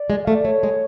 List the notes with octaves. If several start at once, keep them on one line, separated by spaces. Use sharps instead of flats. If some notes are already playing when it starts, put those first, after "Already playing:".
Already playing: D5
G#3
A3 F5
D5
A3 C#5
G#3